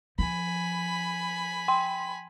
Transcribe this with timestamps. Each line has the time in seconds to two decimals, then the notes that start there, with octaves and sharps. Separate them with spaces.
0.19 F3 G#5 B5
1.68 G5 C6